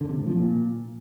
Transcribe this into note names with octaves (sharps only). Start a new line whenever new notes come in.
D3
C3
A2
F3
A#2